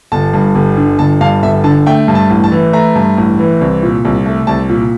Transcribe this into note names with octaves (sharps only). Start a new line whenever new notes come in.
G1 A5
G2
G1
D3
G1 A5
G2 F5
G1 E5
D3 A5
A3 G5
G2
A5
A1
A5
E3
A3 A#5
G2
A1
E3
C2
A#2
C2
A3
C2 A5
A#2